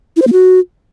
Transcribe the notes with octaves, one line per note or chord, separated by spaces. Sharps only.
E4
C5
A#3
F#4